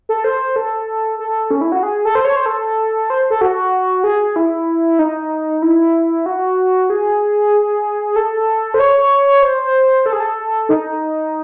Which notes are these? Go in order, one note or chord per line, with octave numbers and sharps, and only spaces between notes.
A4
C5
A4
A4
C#4
E4
F#4
G#4
A4
C5
C#5
C5
A4
C5
A4
F#4
G#4
E4
D#4
E4
F#4
G#4
A4
C5
C#5
C5
A4
G#4
A4
D#4